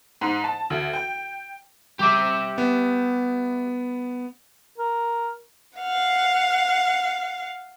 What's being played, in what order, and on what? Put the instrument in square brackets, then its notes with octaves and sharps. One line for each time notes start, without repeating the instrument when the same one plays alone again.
[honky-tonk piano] G#2
A5
D2
G5
[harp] G3 D6 [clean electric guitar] G4 E5
[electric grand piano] B3
[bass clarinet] A#4
[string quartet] F5 F#5